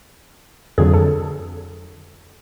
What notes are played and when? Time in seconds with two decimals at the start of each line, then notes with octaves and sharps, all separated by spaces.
0.78 F2 D3 F#3 G#4
0.94 A4